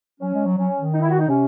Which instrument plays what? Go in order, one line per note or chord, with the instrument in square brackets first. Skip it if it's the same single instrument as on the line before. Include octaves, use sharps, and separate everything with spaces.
[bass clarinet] F#3 [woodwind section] C#4
[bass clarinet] G#3
F#3
[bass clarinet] F#3 [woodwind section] C#4
[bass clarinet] D#3
[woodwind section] D#4
E4
F#4
D#4
[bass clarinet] C3 [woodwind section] C#4